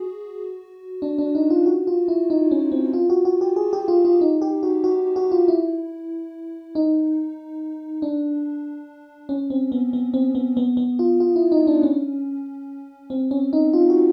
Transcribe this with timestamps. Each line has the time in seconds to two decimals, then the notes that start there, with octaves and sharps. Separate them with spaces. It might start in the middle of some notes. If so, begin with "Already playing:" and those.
Already playing: F#4 G#4
1.02 D4
1.18 D4
1.35 D#4
1.50 F4
1.66 F#4
1.87 F4
2.08 E4
2.30 D#4
2.51 C#4
2.72 C4
2.93 F4
3.10 F#4
3.25 F#4
3.41 G4
3.56 G#4
3.73 G4
3.88 F4
4.05 F4
4.21 D#4
4.42 G4
4.63 F#4
4.84 F#4
5.16 F#4
5.31 F4
5.48 E4
6.75 D#4
8.02 D4
9.29 C#4
9.50 C4
9.72 B3
9.93 B3
10.14 C4
10.35 B3
10.57 B3
10.77 B3
10.99 F4
11.20 F4
11.36 E4
11.52 D#4
11.67 D4
11.83 C#4
13.10 C4
13.31 C#4
13.53 D#4
13.73 F4
13.90 F#4